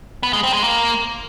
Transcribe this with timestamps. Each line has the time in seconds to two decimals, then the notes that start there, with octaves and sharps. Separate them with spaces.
0.23 B3
0.33 G#3
0.43 C4
0.53 G#3
0.64 A#3